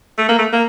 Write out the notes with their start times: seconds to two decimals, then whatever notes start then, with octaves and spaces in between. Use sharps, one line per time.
0.18 A3
0.29 A#3
0.39 A3
0.53 A#3